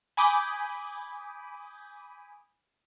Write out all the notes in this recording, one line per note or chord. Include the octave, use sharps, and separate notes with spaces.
G#5 B5 D6 D#6 G6